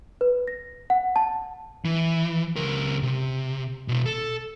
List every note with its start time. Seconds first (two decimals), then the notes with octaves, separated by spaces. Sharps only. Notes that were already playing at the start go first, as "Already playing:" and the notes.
0.21 B4
0.48 A#6
0.90 F#5
1.16 A5
1.85 E3
2.56 C#2 A#4
3.03 C3
3.88 B2 E4
4.06 A4